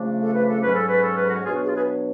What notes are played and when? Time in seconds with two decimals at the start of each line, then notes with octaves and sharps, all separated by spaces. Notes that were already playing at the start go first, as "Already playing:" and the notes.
Already playing: C#3 F3 A3 D4
0.22 A4
0.35 B4
0.48 A4
0.62 G#2 F#3 C#4 B4
0.75 A4
0.89 B4
1.02 A4
1.15 B4
1.28 F#4 A4
1.44 B2 F#3 B3 D4 F4 G#4
1.56 F#4
1.65 F4 G#4
1.75 G#4 B4